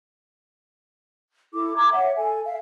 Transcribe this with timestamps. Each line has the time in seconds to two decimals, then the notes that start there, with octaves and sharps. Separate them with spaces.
1.53 E4 A4 D6
1.76 A#5 D6 G#6
1.93 C#5 E5 F#5
2.17 A4 G#5
2.46 E5 F5